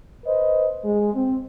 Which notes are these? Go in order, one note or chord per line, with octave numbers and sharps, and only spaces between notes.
B4 C5 D#5
G#3
C4